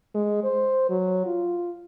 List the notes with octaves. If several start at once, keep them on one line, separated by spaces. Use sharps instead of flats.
G#3
C5
F#3
F4